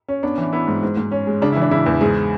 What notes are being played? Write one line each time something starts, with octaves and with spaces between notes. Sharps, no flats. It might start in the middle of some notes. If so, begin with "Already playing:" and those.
C#4
B3 D4
E3
B3 E4
G#2
G#2
G#2
C#4
G#3
C#3 D4
E4
E3
D4
C#3 E4
E2
G#2 G#4